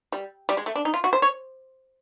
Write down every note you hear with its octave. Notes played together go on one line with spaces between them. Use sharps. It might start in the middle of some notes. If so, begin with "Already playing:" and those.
G3
G3
G#3
A3
D4
D#4
F4
F#4
C5
C#5